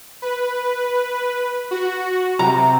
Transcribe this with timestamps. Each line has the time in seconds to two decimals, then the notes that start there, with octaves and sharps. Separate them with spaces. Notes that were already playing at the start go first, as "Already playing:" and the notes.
0.22 B4
1.71 F#4
2.39 C3 A#5